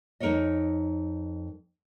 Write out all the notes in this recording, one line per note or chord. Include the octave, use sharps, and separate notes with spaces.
F2 D#4 A#4 C5 C#5 D#5